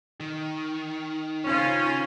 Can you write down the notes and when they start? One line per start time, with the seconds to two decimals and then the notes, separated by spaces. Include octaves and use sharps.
0.20 D#3
1.45 C#3 C#4 F4 C5